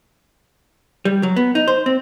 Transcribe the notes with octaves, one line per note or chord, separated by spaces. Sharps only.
G3
F#3
B3
D#4
C5
C4